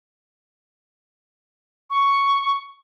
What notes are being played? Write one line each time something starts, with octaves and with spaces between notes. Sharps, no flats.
C#6